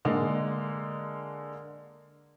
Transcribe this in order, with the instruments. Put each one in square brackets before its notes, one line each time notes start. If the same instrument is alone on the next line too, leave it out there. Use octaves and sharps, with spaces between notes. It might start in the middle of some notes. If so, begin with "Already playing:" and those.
[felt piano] D3 G#3 A#3